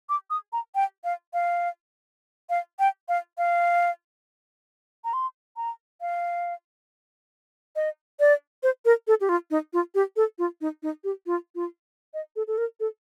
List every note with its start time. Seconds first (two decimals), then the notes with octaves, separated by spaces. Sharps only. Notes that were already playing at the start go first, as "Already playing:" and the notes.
0.09 D6
0.30 D#6
0.53 A#5
0.75 G5
1.04 F5
1.34 F5
2.50 F5
2.79 G5
3.09 F5
3.38 F5
5.04 A#5
5.13 C6
5.57 A#5
6.01 F5
7.76 D#5
8.20 D5
8.63 C5
8.85 A#4
9.08 A4
9.21 G4
9.29 F4
9.51 D#4
9.73 F4
9.95 G4
10.16 A4
10.39 F4
10.61 D#4
10.83 D#4
11.04 G4
11.26 F4
11.55 F4
12.14 D#5
12.36 A4
12.47 A4
12.58 A#4
12.80 A4